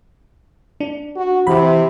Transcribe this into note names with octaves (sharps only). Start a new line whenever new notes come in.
D4
F#4
C3 E3 B5